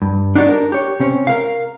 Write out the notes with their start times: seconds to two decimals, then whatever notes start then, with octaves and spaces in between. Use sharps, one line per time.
0.02 G2
0.35 D4 D#4 F#4 G4 D5
0.47 D4 A#4
0.72 G4 C#5
1.00 C3 C4 C#4
1.27 A#4 F5